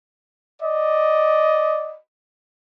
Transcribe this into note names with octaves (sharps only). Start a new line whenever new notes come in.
D5 D#5